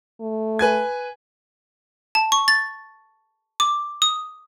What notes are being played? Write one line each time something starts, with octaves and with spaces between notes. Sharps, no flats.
A3
B4 G#5 G#6
A5
C#6
A6
D6
D#6